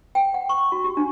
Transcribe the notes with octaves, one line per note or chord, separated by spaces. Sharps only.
G5
F#5
C#6
F#4
G4
D4